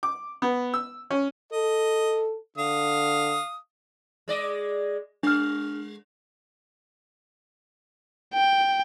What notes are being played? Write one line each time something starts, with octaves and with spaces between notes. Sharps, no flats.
D6
B3
E6
C#4
A4 D#5
D3 F5 D#6
G#3 D5 D#5
G#3 D4 F6
G5